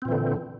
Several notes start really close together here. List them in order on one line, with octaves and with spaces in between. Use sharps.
C4 A#2 E3 D3